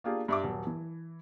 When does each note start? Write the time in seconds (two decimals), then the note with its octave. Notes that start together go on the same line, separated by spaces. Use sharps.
0.04 A#3 D4 F4 G4 G#4
0.28 G2 E5 D6
0.43 D#1 F#3
0.67 E3